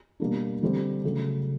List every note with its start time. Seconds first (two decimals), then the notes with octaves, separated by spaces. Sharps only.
0.20 B2 G3 A#3 D4
0.62 D3 G3 C4
1.04 C#3 F#3 A3